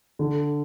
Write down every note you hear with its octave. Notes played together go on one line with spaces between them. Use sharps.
D3